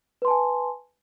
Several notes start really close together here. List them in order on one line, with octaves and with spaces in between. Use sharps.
B4 C6 A5 G#5